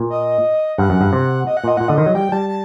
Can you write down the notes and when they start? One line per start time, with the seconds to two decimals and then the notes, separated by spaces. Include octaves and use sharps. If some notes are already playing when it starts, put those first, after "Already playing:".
Already playing: A#2
0.10 D#5
0.78 G2 F#5
0.90 F#2
1.01 G2
1.13 C3
1.47 D#5
1.57 F#5
1.64 A#2 D#5
1.77 A#2 F#5
1.88 D3 D#5
1.98 D#3
2.06 F#3
2.15 G3 G5
2.32 G3 A5
2.49 A5